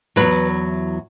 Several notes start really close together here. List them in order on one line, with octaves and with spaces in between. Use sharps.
B2 F#3 B4 E2